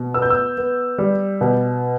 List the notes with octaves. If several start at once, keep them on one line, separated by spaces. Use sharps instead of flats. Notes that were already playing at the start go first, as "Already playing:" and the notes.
Already playing: B2
B3 E6
G6
E6
B3
G3
B2